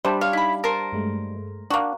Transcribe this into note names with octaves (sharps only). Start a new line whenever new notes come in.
G3 D4 C5 E5 A5 B5
C#5 F5 C6 G#6
D#4 E4 B5
A#4 C5 A5
G2 G#3 A3
A#3 D4 F#4